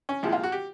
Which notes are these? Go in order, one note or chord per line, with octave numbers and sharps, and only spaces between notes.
C#4
C2 A#2 F3 G#3 E4
F4
F#4
G4